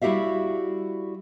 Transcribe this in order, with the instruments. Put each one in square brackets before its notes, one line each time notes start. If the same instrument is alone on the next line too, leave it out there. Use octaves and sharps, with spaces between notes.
[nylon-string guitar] G3 E4 F#4 G4 E5 F5